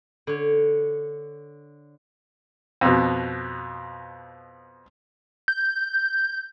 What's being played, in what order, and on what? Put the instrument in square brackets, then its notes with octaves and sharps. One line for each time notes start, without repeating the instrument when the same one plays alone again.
[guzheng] D3 C#5
[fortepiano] F2 B2
[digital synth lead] G6